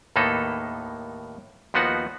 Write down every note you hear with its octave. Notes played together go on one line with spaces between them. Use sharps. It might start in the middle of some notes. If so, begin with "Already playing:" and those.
D#2 A2 A#3 B3 D#4 A4
D#2 F3 B3 D#4 F#4 F#5